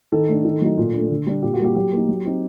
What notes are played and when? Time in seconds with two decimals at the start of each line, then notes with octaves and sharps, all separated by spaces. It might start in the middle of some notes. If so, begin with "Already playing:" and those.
0.12 D#3 A4
0.28 A3 D4
0.45 D#3
0.62 F#3 A3 D#4
0.77 A#2
0.93 A3 D4
1.10 D3
1.27 G3 D4
1.42 A#2 G4
1.53 F#4
1.59 G3 A#3 G4
1.75 F#3 G4
1.93 A#3 D#4
2.09 F#3
2.25 C4 D#4